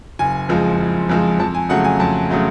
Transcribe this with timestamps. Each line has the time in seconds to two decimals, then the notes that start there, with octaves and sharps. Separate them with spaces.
0.19 F#1 G#5
0.49 F2 F3 G#3
0.80 F#1
1.09 F2 F3 G#3
1.39 F2 A5
1.54 G#5
1.69 C#3 F#3 A3 F#5
1.84 G#5
2.00 F2 A5
2.31 C#3 F#3 A3